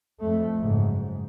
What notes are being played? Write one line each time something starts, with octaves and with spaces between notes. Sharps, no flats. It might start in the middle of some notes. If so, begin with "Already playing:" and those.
F2 A3
F#1 G#2